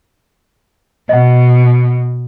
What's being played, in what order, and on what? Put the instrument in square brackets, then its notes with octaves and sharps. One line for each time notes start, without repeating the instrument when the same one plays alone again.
[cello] B2 [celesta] D#5 F#5